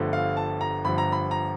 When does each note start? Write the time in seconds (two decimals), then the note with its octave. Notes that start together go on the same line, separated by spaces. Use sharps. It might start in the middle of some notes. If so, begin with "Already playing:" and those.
Already playing: G1 G2 D3 F3 A3
0.13 F5
0.37 A5
0.61 A#5
0.85 G1 G2 D3 F3 A3 B5
0.98 A#5
1.12 B5
1.31 A#5